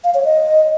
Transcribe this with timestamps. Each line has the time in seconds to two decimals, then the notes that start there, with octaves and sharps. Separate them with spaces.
0.04 F5
0.14 C#5
0.25 D#5